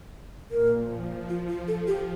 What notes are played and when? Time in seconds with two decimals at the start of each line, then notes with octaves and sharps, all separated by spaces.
0.51 A#2 A#4
0.80 F3
1.10 F3
1.29 F4
1.39 F3
1.48 F4
1.68 F3 A4
1.87 G4